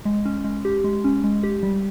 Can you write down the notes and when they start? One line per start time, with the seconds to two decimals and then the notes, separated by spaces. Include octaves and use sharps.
0.05 G#3
0.26 C#4
0.44 G#3
0.65 G4
0.84 G#3
1.04 C#4
1.24 G#3
1.43 G4
1.63 G3